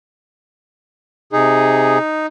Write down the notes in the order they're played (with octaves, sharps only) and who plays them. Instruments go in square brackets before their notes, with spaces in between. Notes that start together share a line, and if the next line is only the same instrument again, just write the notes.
[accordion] C3 G#4 [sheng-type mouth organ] D#4